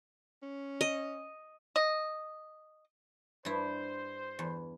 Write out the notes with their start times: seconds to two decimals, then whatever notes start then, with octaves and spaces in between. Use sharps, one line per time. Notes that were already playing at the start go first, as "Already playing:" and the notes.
0.43 C#4
0.81 D#5
1.76 D#5
3.45 G2 E4 C5
4.39 E2